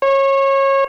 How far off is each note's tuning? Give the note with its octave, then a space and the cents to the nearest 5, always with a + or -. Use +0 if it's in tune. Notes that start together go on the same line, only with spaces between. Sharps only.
C#5 -25